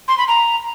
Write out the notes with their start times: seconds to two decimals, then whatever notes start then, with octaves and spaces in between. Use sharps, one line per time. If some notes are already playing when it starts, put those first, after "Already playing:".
0.08 C6
0.18 B5
0.28 A#5